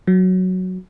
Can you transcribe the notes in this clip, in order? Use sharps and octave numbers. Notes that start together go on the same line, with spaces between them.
F#3